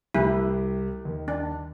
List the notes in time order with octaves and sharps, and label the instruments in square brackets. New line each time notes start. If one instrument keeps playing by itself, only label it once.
[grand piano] C2 G4 F#6 [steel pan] E4
[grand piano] D#2
[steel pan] D4